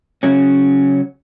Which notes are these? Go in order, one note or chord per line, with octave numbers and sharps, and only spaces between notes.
C#3 F#3 C#4